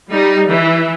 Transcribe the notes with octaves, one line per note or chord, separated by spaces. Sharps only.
G3 D#4
E3